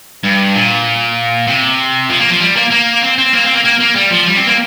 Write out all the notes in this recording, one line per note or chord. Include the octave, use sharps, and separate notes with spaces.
G2
A#2
C3
F3
A#3
F3
G3
A#3
A#3
C4
C4
A#3
C4
A#3
A#3
A#3
G3
F3
G3
C4
A#3